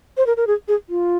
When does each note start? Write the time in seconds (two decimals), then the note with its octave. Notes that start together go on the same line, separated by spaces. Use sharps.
0.17 C5
0.26 A#4
0.37 A#4
0.47 G#4
0.68 G#4
0.89 F4